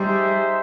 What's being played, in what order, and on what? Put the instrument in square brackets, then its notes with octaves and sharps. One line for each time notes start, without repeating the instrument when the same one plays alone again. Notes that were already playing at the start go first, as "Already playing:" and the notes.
Already playing: [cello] G3 [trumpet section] D#4 G#4 C5 E5